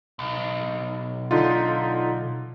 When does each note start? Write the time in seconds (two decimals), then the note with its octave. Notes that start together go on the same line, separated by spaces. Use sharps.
0.19 B1
1.31 D3 D#4 F4